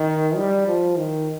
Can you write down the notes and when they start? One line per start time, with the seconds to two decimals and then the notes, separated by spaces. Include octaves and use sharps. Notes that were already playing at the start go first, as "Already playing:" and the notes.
Already playing: D#3
0.36 G3
0.67 F3
0.97 D#3